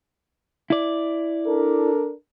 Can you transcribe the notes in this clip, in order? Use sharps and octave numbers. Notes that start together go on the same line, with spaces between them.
E4 D5
D4 A4 A#4